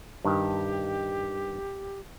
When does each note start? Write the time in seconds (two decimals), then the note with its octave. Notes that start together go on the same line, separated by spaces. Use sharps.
0.24 G2 D#3 G4